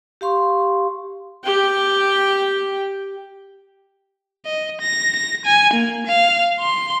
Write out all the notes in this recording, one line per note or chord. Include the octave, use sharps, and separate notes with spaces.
G4 F5 C6 C#6
G4 G5
D#5
A#6
A#6
G#5
A#3
F5
C6